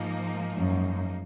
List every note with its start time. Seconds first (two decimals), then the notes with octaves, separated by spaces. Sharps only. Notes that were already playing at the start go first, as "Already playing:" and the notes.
Already playing: G#2 F3 A#3 D#4
0.57 F#2